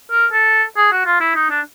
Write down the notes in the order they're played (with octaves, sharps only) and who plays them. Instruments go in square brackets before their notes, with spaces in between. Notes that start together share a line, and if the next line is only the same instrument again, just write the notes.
[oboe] A#4
A4
G#4
F#4
F4
E4
D#4
D4